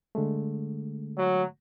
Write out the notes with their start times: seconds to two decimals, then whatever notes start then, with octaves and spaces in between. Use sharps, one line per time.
0.15 D3 G#3 A3
1.18 F#3